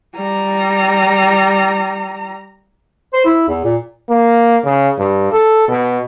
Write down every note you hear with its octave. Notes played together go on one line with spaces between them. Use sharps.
G3 A#5
C5
E4
E2
A#2
A#3
C#3
G2
A4
B2